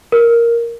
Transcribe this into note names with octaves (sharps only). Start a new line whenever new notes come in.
A#4